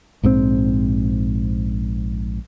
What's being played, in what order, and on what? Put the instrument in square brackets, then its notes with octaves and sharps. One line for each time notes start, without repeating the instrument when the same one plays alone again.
[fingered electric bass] A#1 G#2 D#3 C4